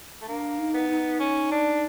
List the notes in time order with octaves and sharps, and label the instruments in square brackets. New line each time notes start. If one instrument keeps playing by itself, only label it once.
[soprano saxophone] A3
[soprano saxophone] A#3 [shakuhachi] D4
[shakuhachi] D#4
[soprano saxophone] B3
[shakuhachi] D#4
[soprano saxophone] C#4
D4